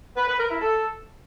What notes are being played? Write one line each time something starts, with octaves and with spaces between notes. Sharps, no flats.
B4
B4
A#4
E4
A4